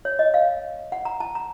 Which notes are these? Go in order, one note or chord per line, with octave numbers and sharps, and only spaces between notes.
C#5
D#5
F5
F#5
A#5
A5
A#5